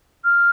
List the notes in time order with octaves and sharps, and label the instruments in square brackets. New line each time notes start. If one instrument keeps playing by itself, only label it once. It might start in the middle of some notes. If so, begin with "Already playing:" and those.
[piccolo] F6